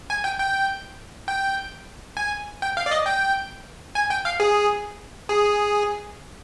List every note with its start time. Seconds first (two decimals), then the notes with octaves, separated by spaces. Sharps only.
0.10 G#5
0.24 G5
0.39 G5
1.28 G5
2.17 G#5
2.62 G5
2.77 F5
2.86 D5
2.91 D#5
3.06 G5
3.95 G#5
4.10 G5
4.25 F5
4.40 G#4
5.29 G#4